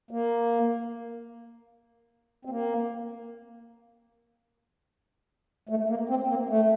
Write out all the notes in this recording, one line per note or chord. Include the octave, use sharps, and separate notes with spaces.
A#3
C4
A#3
A3
A#3
C4
A#3
A3